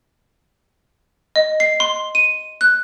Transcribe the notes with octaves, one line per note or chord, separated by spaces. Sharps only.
D#5
C7
C6
D#7
F#6